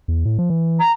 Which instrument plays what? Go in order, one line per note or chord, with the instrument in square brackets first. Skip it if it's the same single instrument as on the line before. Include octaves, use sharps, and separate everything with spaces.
[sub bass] E2
A2
F3
E3
[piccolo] A#5